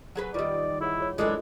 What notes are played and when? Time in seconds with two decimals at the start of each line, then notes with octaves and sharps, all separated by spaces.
0.16 F#3 G#4 B4 F#5
0.34 D#3 G3 F4 B4 D5 D#5
0.81 E4 G#4 C#5 F#5
0.98 F4 G#4 C#5
1.18 F#2 E3 G#3 D4 F4 A4 D#5